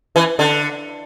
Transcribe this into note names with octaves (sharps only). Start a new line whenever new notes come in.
E3
D3